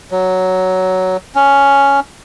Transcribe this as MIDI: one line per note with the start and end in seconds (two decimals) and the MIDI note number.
0.11 1.17 54
1.35 2.00 61